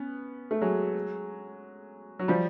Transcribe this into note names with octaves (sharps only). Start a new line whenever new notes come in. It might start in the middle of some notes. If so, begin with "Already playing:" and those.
Already playing: B3 C#4
A3
F#3 G#3
F#3
F3 G3